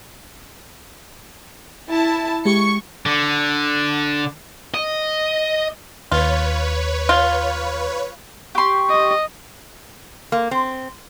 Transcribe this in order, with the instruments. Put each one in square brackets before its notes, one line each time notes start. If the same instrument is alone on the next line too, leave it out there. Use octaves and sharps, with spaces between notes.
[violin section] E4 A5
[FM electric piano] G#3 G4 [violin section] C#6 C#7
[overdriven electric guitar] D3
D#5
[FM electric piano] D#2 [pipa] F4 [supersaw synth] B4 C#5
[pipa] F4
[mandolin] G4 C6 [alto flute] C#6
[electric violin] D#5
[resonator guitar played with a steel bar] A#3
C4